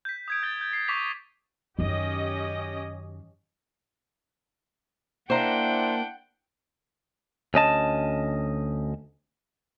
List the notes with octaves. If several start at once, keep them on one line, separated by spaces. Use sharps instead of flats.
G6 B6
D#6 G#6 D7
G6 A6 G7
G6
C7
C#6 D6 B6 F7
F#2 D#3 C#4 G4 D#5
A#3 D4 E4 C5 F#5 G5 A#5
D2 C#4 D#5 A5